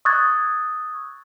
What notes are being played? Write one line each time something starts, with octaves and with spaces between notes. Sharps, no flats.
C#6 D#6 E6 F#6 G#6 A6